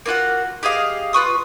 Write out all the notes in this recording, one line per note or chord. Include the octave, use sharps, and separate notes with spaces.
A#3 F4 F#4 F#5
G4 G#4 D#5 F5
F4 B4 C#6 D#6